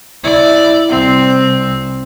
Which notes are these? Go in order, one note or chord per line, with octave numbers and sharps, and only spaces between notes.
E4 D5
C2 C4